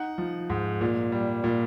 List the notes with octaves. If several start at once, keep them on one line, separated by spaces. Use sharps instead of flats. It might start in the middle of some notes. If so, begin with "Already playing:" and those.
Already playing: D#4 F#5
F3
G#2
A#2
G3
A#2